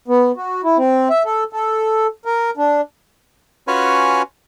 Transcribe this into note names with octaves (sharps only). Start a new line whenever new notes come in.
B3
F#4
E4
C4
E5
A4
A4
A#4
D4
C#4 F4 F#4 B4 C#5 G#5